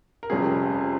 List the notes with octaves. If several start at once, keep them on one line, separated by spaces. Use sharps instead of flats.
A#4
F1 F2 C3 G3 C#4 G#4